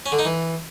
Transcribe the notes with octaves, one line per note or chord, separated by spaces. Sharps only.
C#4
D3
D#4
E3